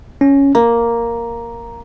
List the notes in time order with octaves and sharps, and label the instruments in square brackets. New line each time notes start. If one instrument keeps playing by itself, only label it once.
[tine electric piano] C#4
[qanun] A#3 [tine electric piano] A#5